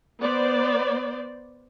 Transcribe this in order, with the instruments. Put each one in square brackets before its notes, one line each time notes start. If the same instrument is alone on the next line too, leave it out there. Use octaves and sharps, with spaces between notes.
[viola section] B3 C5 D5